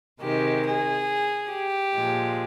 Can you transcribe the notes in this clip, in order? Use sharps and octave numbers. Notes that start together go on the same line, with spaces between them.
C3 D#3 G#3 G4
G#4
G4
A#2 F3 G#3